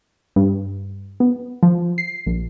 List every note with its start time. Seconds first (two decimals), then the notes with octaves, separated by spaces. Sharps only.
0.36 G2
1.20 B3
1.63 F3
1.98 C7
2.27 A#1